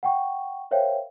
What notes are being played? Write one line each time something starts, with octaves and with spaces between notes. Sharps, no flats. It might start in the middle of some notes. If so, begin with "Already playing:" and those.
F#5 G5 C#6
A#4 C5 C#5 E5 F5 G5